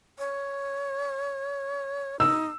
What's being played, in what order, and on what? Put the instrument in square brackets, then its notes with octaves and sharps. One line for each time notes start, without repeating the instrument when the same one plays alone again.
[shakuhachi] C#5
[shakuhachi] D#4 [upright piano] E6